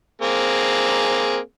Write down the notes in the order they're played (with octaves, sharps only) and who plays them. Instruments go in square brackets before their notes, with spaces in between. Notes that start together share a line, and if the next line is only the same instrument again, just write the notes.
[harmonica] A#3 C4 G#4